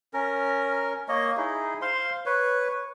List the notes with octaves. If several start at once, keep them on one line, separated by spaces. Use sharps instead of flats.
C#4 A#4
A#3 C#5 D#5
D#4 E4 G#4
C5 F5 C6
B4 C#5